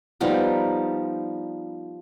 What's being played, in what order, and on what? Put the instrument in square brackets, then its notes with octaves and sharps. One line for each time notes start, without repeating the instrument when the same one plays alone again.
[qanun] F3 G3 B3 D#4